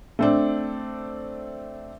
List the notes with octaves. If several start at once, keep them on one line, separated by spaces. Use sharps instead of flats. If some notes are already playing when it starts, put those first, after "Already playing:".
A3 C4 D4